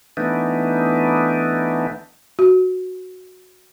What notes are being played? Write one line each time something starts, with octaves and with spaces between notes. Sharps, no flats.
E3 A3 B3 D4 D#4
F#4